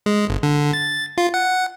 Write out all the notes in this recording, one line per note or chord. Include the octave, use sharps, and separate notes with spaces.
G#3
G1
D3
A6
F4
F#5